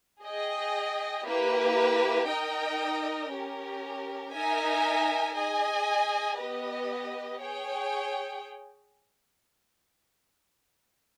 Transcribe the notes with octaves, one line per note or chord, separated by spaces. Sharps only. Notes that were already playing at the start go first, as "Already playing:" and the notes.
G#4 D#5 G5
A#3 E4 G4 B4
D#4 A#4 D#5 G5
C#4 G4 A#4
D#4 A#4 E5 G#5
G#4 D#5 G#5
B3 G4 B4 D#5
G#4 C#5 G5